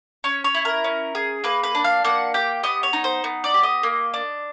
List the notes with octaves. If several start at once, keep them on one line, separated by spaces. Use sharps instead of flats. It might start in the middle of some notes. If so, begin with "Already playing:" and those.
C#4 C#5
C#5
E4
A#4
C#4
G#4
A#3 B4
B4
D4
F5
A#3 F#5
G4 G5
B3 D#5
C#5
D#4
C5
B3
D5
G4
D#5
A#3
D4